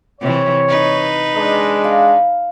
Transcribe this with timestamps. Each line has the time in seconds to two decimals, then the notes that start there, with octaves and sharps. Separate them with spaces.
0.21 C3 E3 C#5
0.68 D#4 B4
1.35 G#3 D4
1.84 F5